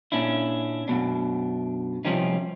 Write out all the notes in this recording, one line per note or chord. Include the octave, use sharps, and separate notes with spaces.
A#2 C#4 D4 E4
F#2 B2 D4
C3 F3 G3 C4 C#4 D#4